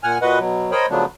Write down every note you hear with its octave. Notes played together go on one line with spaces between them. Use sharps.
A#2 F#5 G#5 F6
A#2 F#4 B4 D#5 F#5
B2 F#3
A#4 C5 C#5 D#5 G5 B5
C#3 F3 F#3 A3 B3 D4